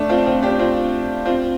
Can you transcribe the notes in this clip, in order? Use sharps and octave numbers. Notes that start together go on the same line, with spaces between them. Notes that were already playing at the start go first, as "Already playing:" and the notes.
Already playing: A3 D4
C4 F4
C4 F4
D4 G4
C4 F4
C4 F4